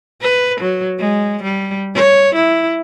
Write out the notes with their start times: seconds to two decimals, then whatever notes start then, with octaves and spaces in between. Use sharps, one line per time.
0.21 B4
0.60 F#3
0.99 G#3
1.43 G3
1.95 C#5
2.35 E4